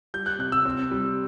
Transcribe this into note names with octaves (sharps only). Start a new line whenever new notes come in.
G3 G6
F#6
C3 F#6
E6
C4
G3